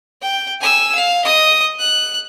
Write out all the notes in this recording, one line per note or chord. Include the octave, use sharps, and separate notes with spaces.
G5
G#5 E6
F5
D#5 D#6
F#6